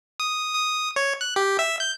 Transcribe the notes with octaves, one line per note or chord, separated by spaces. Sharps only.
D#6
D#6
C#5
F#6
G4
E5
G6